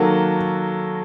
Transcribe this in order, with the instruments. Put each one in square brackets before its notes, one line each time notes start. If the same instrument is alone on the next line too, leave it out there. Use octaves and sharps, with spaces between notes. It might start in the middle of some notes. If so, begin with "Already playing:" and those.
Already playing: [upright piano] D#3 F#3 A#3 F#4 A4